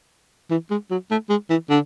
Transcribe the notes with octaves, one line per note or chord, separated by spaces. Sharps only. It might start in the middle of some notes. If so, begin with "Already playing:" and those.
E3
G#3
F#3
A3
G#3
E3
D3